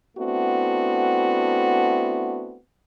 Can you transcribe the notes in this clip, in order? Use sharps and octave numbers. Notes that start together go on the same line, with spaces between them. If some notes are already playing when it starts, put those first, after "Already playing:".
A3 B3 C4 D4 E4 F#4